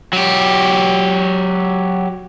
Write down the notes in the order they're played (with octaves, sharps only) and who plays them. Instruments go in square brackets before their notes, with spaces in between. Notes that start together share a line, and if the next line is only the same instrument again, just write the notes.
[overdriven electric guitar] F#3 G4